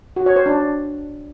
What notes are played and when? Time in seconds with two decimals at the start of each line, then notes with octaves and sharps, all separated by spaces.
0.16 F#4
0.26 C#5
0.36 C5
0.46 D4